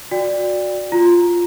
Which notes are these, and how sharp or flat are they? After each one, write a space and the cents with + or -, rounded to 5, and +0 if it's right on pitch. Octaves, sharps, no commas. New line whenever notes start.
F#4 -25 D5 +5 G5 +25
F4 -5 A#5 +0